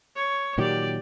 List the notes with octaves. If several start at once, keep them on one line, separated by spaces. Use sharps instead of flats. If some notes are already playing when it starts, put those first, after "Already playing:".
C#5
A#2 D#3 F#3 G4 D5